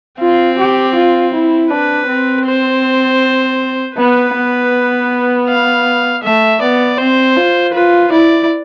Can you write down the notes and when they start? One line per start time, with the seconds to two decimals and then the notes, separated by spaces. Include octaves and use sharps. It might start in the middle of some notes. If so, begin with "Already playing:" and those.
0.20 C4 F4
0.58 G4
0.95 F4
1.33 E4
1.71 D4 B4
2.08 C4
2.47 C5
3.97 B3 B4
4.35 B3
5.48 F5
6.24 A3 E5
6.61 B3 D5
6.99 C4 C5
7.37 F4
7.74 F4 B4
8.12 E4 D5